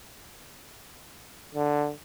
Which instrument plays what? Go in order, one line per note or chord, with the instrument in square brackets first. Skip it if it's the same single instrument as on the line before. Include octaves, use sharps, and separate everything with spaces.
[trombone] D3